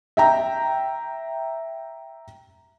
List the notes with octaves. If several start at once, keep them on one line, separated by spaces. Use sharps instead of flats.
E5 G5 A#5